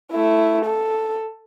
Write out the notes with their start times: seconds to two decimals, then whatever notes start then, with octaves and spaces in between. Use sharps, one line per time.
0.12 A3 E4
0.65 A4